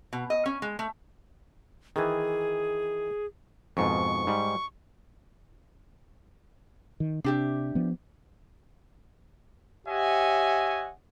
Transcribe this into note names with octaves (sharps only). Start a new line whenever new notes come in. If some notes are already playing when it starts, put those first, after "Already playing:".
B2
D#5
C#4
G#3
A3
D#3 E3 G#4
F2 G#2 B2 C#6
G#2 G3
D#3
C3 D4 G4 E5
F3 B3
G4 C#5 D#5 E5 F#5 G#5